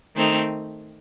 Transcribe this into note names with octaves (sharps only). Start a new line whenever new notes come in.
D#3 A3 C4 D#4